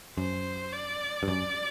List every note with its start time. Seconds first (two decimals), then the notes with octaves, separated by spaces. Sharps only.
0.17 F#2 C5
0.72 D5
1.23 G2
1.28 F#2 D5